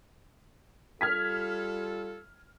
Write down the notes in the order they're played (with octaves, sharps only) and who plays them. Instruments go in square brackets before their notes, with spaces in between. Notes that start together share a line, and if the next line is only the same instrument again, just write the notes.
[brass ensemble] G3 F4 A4 [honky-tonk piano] F6 G#6 B6